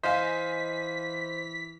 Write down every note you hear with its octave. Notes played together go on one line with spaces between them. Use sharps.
E3 C5 D#5 F5 G#5 B6